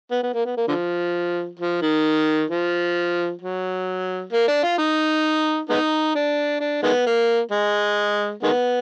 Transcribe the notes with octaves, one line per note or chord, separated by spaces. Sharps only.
B3
B3
A#3
B3
A#3
D3 F3
F3
D#3
F3
F#3
A#3
D4
F4
D#4
G#3 B3 D#4
D4
D4
D#3 G#3 B3
A#3
G#3
D#3 G#3 B3